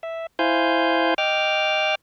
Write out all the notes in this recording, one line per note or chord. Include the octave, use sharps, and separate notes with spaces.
E5
E4 C5 F5 G#5 G6
D#5 G5 D6 F6